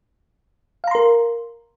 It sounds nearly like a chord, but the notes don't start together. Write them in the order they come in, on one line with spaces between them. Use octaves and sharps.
F5 A#5 C6 A#4